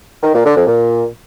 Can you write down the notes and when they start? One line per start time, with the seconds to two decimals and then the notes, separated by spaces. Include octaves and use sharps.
0.23 D#3
0.34 A#2
0.45 D3
0.56 F2
0.67 A#2